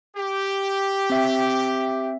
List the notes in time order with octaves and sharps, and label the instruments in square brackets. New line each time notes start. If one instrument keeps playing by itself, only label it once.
[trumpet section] G4
[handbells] C4 E5